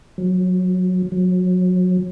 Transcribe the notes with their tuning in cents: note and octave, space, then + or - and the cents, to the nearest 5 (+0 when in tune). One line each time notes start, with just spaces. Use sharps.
F#3 -15
F#3 -25